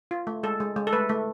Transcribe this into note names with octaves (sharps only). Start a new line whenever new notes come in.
F4
A3
G#3 A4
G#3
G#3
A4
A3 B4
A3